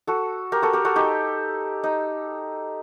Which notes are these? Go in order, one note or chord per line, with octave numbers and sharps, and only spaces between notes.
F#4 A4
G4 A#4
F#4 A4
G4 A#4
F#4 A4
D#4 G4
D#4